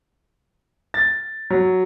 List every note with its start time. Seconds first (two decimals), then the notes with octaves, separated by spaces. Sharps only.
0.94 A6
1.50 F#3